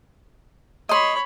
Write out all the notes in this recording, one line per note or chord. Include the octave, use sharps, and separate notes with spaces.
C#5 D#5 B5 C6